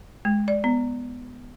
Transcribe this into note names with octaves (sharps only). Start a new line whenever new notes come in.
G#3
D5
B3